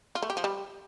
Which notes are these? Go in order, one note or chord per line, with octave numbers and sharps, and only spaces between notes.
F4
A3
G4
F3
G3